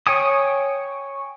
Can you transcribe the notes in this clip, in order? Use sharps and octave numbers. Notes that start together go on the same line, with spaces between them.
C#5 G5 G#5 D#6